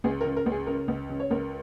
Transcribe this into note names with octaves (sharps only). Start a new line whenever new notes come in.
C#2 G#4
A#4
C#3
A#4
C#2
G#4
C#3 A#4
C#2
C#3
C#5
C#2 A#4